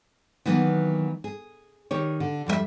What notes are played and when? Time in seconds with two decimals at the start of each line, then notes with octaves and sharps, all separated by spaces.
0.46 D#3 E3 F#3 A#3 B3
1.24 G#4
1.91 D#3 G4 C#5
2.20 D3
2.46 F2 G3 G#4 E5